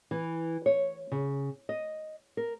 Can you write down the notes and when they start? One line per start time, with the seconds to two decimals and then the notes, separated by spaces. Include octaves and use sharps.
0.11 E3
0.66 C#5
1.12 C#3
1.69 D#5
2.37 A#4